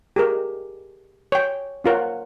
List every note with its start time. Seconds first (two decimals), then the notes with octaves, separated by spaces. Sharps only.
0.16 G4 G#4 A#4
1.32 C#5 G5
1.84 C#4 F4 A#4 C#5 F#5